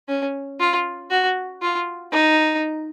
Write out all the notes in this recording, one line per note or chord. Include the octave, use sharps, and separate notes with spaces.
C#4
F4
F#4
F4
D#4